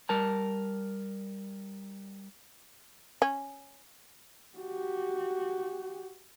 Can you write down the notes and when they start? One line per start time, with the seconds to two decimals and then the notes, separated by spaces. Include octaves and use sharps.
0.09 G3 A#4 A5
3.22 C#4
4.58 F#4 G4